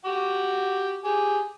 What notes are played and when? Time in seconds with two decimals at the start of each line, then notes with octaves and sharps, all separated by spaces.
0.05 F#4 G4
1.04 G4 G#4